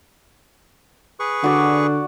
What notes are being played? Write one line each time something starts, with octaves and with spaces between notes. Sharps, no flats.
G#4 B4 C#6
D3 F#4 D5